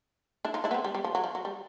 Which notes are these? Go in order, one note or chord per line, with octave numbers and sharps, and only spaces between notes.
D4 E4
D#4 F4
D4 E4
B3
C4
G3
G3
F3
F#3
F3
F#3
G3